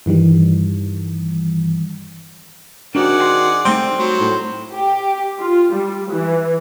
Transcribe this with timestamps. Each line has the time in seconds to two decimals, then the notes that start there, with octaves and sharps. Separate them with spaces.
0.06 G2 D#3 E3 G3
2.95 D#3 D4 F#4 G#4 C5 D5 F#5
3.18 F#4 G5 C6
3.65 G3 A3 C4 D#4
3.99 F#3 C5
4.20 A2
4.73 G4
5.39 F4
5.74 G3
6.12 E3